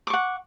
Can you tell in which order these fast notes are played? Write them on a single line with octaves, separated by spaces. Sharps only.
D6 C#6 F#5